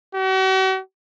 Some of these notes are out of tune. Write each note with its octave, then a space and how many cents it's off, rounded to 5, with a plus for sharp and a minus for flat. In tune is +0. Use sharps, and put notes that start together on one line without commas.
F#4 +45